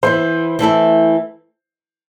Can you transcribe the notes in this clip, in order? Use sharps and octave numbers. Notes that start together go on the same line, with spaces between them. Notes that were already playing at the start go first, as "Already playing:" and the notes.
E3 B3 E4 C5
E3 A3 E4 A4